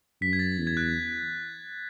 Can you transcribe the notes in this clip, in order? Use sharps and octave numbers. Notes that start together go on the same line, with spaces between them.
F#2 B6
G#6
A6
E2
G#6
F#6